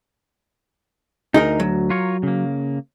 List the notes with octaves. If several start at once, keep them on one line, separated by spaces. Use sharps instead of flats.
D2 D#4 G#4 A#4
F#3
F4 A#4 C#5
C#3 A#3